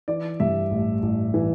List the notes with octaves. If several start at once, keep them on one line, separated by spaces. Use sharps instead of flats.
E3 D5
G2 E5
A1
A1
E3